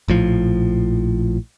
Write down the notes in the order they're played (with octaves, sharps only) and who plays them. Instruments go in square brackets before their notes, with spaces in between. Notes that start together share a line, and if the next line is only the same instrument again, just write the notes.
[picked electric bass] A#1 A2 F3